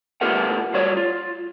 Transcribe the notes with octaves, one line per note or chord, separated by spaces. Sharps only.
A3 B3 F4 G4 A#4 F#5
G3 F4 F#4 C#5
F4